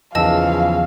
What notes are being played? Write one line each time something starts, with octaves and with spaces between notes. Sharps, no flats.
B1 E2 C#3 F3 D#5 F5 A5 E6